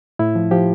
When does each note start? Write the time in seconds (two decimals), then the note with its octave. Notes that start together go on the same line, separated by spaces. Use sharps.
0.19 A2 E4
0.35 F3
0.51 F3 G4